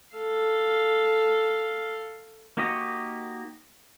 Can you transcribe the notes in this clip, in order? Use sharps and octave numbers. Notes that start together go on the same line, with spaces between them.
A4 F5
A#3 D#4 F#4 G4 D#5